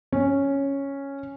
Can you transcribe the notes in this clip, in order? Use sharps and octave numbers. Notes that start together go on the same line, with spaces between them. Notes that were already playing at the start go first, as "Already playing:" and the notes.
C#4